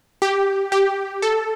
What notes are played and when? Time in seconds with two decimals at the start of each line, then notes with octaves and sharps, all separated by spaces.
0.22 G4
0.72 G4
1.22 A4